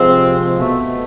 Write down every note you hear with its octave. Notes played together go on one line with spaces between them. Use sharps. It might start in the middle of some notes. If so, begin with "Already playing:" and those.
Already playing: C3 F3 G#3 C4
B2 A3